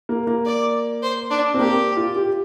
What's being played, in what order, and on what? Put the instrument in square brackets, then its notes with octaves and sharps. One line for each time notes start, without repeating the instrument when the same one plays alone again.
[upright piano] A#3
A#3
[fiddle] D5
C5
D4
[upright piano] C4
[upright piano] A#3 [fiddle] G4
[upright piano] F4
G4